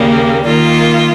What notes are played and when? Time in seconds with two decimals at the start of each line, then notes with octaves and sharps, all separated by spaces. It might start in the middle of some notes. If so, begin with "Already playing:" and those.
Already playing: D#2 C#3 G3 A#3
0.46 D#3 A#3 F4